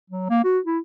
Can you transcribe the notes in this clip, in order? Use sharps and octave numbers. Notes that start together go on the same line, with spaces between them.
F#3
A#3
F#4
E4